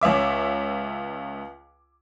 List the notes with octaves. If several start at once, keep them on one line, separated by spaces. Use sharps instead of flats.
C#2 C#4 E5 D6